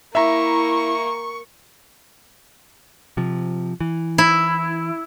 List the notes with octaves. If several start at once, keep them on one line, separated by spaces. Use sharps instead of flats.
A#3 E4 E5 A#5 C#6
C3 F3
E3
E4